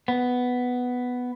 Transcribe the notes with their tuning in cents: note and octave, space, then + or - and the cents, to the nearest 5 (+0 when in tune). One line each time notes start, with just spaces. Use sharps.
B3 +5